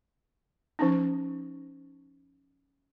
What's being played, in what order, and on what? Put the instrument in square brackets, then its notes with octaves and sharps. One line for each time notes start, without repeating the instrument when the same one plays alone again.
[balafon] F3 C#4 D#4